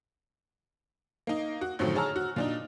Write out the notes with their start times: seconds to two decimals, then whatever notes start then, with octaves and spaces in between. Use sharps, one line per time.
1.27 A#3 D#4
1.61 F#4
1.79 F#2 A2 D3 D#3 F3 F#3
1.95 G#4 C#5 A5 A#5 E6 F6
2.16 F#4
2.36 A#2 D4 D#4